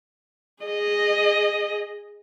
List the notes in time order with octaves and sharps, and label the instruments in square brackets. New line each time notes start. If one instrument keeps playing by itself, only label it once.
[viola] G#4 D#5